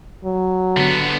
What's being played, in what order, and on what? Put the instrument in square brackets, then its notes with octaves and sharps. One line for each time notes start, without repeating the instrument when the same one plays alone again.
[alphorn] F#3
[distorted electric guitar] D3 B3